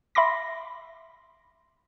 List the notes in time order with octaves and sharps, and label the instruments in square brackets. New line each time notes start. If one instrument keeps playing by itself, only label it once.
[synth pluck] E5 B5 C6 D6 A#6